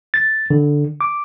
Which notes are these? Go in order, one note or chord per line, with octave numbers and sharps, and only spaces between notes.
A6
D3
D6